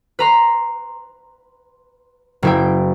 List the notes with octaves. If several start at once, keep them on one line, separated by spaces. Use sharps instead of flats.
B4 A#5 C6
F#1 E4 G5